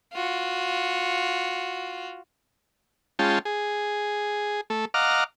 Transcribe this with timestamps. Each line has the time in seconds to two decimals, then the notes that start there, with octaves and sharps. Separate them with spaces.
0.14 F4 F#4
3.19 G#3 C#4 F4 G5 A5
3.45 G#4
4.70 A3 A4
4.94 D#5 F5 F#5 A#5 D6 F6